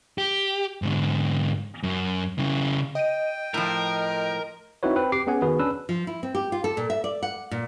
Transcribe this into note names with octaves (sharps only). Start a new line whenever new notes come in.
G4
G#2 D3
F#2
C#3 E4
D#5 G5 D#7
A2 F3 A#4
C4 D#4 E4 F#4 B4 C#5
C4 B4
G4 D6 C7
B3 C#4 G#4 F#5 G#5
D#3 B3 F#4 G#4 B4
C#4 D4 B4 E6
F3
E4
C4
G4
F4
A4
A#2
E5
D5
F#5
A#2